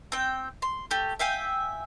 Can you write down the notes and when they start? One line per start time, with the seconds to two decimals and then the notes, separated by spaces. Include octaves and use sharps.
0.12 C4 G5
0.62 C6
0.91 A3 G4
1.19 E5 F5 G5 G#5